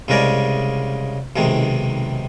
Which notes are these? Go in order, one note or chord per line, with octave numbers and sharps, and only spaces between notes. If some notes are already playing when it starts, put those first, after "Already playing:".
C2 C#3 G#3 A#4 D5 G#5
B1 C3 D#3 G#3